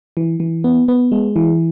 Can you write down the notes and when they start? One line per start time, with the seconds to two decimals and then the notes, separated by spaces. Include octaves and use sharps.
0.17 E3
0.40 E3
0.64 B3
0.88 B3
1.12 G#3
1.36 E3